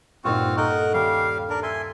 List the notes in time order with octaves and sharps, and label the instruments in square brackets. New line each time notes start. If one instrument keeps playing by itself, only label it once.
[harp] G2 A#2 D#4 [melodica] C4 F4 F#4
[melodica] D#4 A#4 F#5 [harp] A4
[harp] D#2 C#4 [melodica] G3 F5
[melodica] D4 A#4
[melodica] E5 G#5 C6 [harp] A6